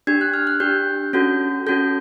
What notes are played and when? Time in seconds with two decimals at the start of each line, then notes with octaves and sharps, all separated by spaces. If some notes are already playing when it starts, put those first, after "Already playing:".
0.07 D4 G4 G#6
0.21 F#6
0.34 F6
0.47 F#6
0.60 D4 G4 G6
1.13 C#4 F#4 A4 G6
1.66 C#4 F#4 A4 G6